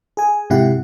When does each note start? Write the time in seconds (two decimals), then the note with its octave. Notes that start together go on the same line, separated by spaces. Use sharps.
0.17 G#4 G#5
0.50 G#2 C3 E4 G4 F#5